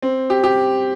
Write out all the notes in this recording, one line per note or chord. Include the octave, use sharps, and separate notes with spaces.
C4
G4
G4